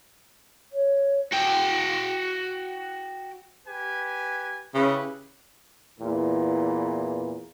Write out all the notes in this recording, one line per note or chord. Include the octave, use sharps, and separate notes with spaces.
C#5
F#4 G5
G4 B4 G#5
C#3 E4 G4 B4
E2 A#2 E3